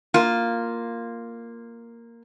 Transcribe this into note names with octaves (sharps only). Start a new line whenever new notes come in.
A#3 F4